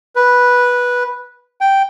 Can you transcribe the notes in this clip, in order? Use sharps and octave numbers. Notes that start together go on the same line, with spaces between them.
B4
G5